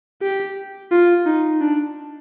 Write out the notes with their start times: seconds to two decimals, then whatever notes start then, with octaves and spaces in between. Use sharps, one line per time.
0.22 G4
0.91 F4
1.26 D#4
1.61 D4